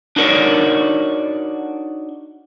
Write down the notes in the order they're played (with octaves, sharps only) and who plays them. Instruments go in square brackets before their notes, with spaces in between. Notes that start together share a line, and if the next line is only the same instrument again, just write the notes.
[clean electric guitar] D4 D#4 F#4 A#4 C#5 D5